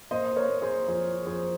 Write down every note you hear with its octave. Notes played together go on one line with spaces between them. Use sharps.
A#3 C5 D#5
A#4 C#5
A#3
G#4 C5
F2 G#4 C5
F2 G#4 C5